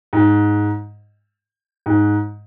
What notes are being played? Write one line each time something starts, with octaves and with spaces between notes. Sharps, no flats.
G#2
G#2